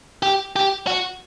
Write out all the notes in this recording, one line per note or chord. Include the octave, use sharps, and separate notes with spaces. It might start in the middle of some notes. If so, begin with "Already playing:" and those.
G4
G4
F#4